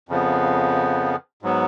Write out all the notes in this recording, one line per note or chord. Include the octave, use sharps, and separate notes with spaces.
F2 C#3 F3 B3
G#2 F#3 B3